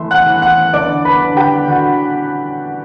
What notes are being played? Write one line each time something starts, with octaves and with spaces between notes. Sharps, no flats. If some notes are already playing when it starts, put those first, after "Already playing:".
Already playing: E3 A3 E5 C6
F#5 F#6
E3
F#5 F#6
D3 D5 D6
B4 B5
D3
G4 G5
D3 F#4 F#5